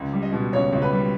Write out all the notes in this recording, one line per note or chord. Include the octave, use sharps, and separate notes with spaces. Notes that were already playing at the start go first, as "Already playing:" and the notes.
Already playing: C#2
G3
D#5
B2
C#2 C#5
C#2
B4
G3